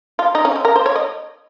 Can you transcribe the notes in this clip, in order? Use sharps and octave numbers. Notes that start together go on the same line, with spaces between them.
F4
D#4
C#4
C4
A#4
C5
C#5
D#5